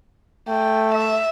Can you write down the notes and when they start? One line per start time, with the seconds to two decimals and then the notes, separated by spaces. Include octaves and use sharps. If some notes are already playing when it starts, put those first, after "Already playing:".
0.48 A3 G5
0.94 E5